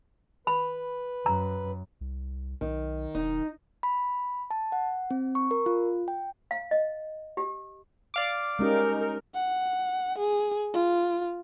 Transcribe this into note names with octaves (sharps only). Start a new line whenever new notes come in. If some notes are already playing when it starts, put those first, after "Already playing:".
B4 B5
F#2 A#5
C2
B1 D#3
E1 D#4
B5
A5
F#5
C4
C#6
A#4
F4
G5
F5
D#5
G4
D5 F5 D6
G#3 C#4 D#4 G4 A#4
F#5
G#4
F4